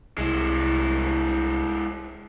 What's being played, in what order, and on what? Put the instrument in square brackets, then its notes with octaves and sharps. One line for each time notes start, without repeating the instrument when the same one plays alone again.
[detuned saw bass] C2 [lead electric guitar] G#3 E4